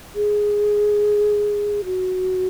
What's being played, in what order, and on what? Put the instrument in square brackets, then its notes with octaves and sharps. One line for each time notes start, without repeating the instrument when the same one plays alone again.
[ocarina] G#4
F#4